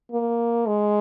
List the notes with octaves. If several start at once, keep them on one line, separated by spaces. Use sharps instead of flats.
A#3
G#3